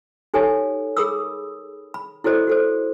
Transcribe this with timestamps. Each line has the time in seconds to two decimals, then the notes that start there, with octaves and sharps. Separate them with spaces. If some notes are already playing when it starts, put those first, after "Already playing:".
0.34 D#4 G4 A4 C#5 G#5
0.97 G#4 A#4 B5 D#6 E6
1.94 B5
2.24 E4 F#4 A4 C5 D5 D#5
2.47 F#4 A4 C5